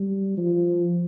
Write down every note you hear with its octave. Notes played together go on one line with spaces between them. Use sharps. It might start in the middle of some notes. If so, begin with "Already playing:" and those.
Already playing: G3
F3